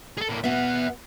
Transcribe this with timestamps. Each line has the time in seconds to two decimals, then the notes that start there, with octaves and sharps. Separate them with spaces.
0.18 G#4 A4
0.30 A2 A#3
0.44 B2 B3 E5 F#5